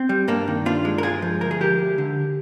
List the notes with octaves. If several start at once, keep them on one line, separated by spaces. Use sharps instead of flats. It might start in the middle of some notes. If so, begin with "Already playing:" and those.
Already playing: C4
G3
G2 A#3 D4
D#3
G2 D4 F4
G#3
A#4
G2 F4 G#4
F3
D2 A#4
G#4
G#3 G4 A#4
D2
D3